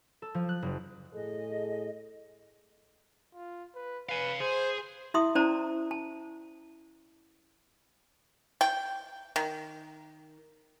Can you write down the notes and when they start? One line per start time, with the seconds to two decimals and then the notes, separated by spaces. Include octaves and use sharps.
0.22 A4
0.34 F3
0.49 F#6
0.62 F#1
1.14 A2 G#4 A4 D#5
3.35 F4
3.75 B4
4.09 B4 F5 G#5
4.40 G#4 C5
5.14 E4 E5 C6 D#6
5.35 C#4 E4 C5 D5 A5 A#5
5.91 A5
8.61 G5
9.36 D#3